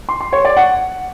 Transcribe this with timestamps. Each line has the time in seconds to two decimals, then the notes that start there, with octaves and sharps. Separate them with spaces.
0.09 C6
0.21 C6
0.33 C#5
0.45 D5
0.57 F#5